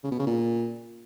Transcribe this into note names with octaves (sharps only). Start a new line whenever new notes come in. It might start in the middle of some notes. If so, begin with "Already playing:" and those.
C#3
B2
C#3
A#2